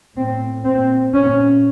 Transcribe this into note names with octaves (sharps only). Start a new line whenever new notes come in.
A2 C4
A#2 C4
A#2 C#4